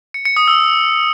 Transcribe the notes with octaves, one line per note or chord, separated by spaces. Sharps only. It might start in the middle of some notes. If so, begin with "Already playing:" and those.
C#7
C#7
D#6
E6